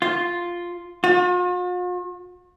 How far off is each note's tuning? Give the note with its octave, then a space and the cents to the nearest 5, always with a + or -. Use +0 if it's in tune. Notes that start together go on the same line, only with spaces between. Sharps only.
F4 +0
F4 +45